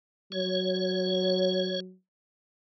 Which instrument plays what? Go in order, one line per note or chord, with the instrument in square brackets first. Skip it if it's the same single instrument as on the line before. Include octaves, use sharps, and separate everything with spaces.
[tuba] F#3 [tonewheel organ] C#5